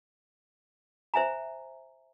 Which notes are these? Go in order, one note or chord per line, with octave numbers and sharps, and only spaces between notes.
C5 E5 G#5 A#5